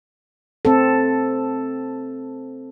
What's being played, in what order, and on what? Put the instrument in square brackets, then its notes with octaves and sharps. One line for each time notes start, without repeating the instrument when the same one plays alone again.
[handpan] C4 A4